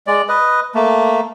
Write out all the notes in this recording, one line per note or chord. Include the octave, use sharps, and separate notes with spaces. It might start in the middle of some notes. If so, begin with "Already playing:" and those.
G#3 D5
B4 D#5
A3 A#3